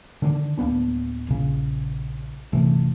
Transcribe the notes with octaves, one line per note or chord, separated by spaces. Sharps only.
D3 D#3 G3 D4
D1 A#3 B3 D4
A#1 C#3
G1 C3 E3 A3